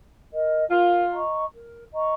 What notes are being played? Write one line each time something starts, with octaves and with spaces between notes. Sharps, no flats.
A#4 D#5
F4 A#4
D#5 A#5 C#6
A#4
D#5 A#5 C#6